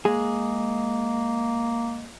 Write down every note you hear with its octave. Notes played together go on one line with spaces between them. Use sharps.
G#3 A#3 G#4